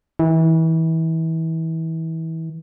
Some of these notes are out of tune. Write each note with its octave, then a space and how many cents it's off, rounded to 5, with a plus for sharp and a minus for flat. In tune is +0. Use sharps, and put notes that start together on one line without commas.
E3 -30